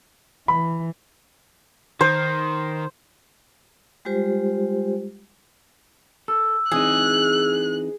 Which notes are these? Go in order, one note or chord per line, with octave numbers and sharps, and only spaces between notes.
E3 B5
D#3 C5
G3 G#3 F4 G4 C5
A4 E6
E3 C4 D#4 G#4 F#6